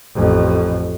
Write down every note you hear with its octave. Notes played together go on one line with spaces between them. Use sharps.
A1 F2